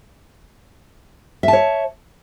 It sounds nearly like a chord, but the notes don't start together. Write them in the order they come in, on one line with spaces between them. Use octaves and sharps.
E5 A5 C#5